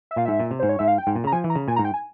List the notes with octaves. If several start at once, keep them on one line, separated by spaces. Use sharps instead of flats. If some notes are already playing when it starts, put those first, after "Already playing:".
E5
A#2 F5
G#2 E5
A#2
C3
G#2 C5
C#5
G#2 E5
F5
G5
G#2
A#2
C#3 A#5
F3 G#5
E3
A#5
C#3
A#2 G#5
G#2 A#5
G5
G#5